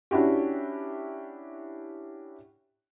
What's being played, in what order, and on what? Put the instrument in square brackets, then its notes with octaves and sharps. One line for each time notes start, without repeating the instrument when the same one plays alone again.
[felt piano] C#4 D4 E4 F#4 G4